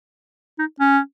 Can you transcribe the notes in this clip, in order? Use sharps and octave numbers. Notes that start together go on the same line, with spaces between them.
D#4
C#4